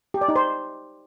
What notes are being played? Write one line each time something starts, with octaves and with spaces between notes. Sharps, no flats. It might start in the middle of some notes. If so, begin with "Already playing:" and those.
G4
D5
D#4
C5